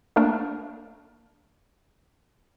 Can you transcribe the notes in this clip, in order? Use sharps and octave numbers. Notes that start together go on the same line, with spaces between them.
A3 A#3 D4 A#4